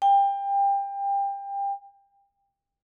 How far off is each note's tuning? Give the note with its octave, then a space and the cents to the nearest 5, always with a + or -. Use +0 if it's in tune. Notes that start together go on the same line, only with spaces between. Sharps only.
G5 +25